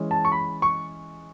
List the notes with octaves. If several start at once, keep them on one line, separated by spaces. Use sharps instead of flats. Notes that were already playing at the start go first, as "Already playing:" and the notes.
Already playing: E3 G#3 C#4
A5
C#6
B5
C#6